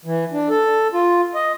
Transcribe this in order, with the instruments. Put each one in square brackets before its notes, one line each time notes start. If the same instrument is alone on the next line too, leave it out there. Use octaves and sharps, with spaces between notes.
[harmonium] E3
D4
A4
F4
D#5